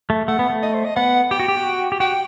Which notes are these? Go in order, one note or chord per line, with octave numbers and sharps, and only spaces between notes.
A3
A3 F#5
B3
A3
D#5
C5
D#5
B3 F#5
G4 G5
F#4
G4
F#4
G4
F#4 G5